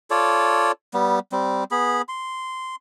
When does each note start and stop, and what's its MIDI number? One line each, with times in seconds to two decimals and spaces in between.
0.11 0.72 65
0.11 0.72 69
0.11 0.72 73
0.11 0.72 74
0.94 1.19 55
0.94 1.19 59
1.32 1.64 55
1.32 1.64 60
1.71 2.02 59
1.71 2.02 68
1.71 2.02 83
2.08 2.76 84